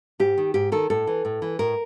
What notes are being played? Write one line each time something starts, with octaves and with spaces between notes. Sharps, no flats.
G#2 G4
D#3
G#2 G4
D#3 A4
A2 A4
E3
A2
E3
A2 A#4